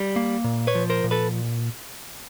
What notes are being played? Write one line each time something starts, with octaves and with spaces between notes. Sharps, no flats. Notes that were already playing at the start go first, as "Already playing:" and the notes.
Already playing: G3
A#3
A#2
B4 C#5
F3
A#4 C5
A#2
A4 B4